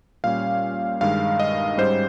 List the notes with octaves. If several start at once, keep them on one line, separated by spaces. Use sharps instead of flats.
A#2 G3 C#4 F5
G2 D#3 G#3 F5
D#5
G#2 G3 C#4 C5